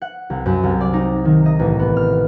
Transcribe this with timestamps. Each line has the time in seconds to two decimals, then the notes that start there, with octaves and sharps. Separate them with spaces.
0.02 F#5
0.30 C2
0.46 F#2
0.63 C2
0.81 D5
0.93 D#4
1.25 D#3
1.46 D#5
1.59 A1
1.79 B3
1.97 F6